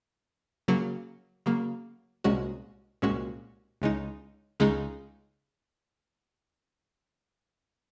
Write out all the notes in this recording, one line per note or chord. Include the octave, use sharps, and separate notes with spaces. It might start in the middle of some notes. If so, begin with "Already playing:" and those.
C#3 F#3 A#3
C#3 F#3 A#3
C2 A#2 G#3 C#4 F#4
C2 A#2 G#3 C#4 F#4
C#2 C#3 G#3 D#4
C#2 C#3 G#3 D#4